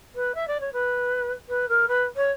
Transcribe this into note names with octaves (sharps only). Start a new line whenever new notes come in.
B4
E5
D5
C#5
B4
B4
A#4
B4
C#5